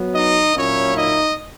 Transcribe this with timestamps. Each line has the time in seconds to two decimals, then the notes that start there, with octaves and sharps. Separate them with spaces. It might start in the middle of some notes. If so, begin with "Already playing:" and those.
Already playing: F#3 B3
0.15 D#4 D#5
0.55 A#2 F#3 A#3 C#4 E4 C#5
0.96 D#4 D#5